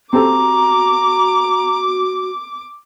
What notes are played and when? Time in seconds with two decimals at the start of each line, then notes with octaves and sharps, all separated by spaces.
0.13 C4 F#4 G4 A4 A#5 D6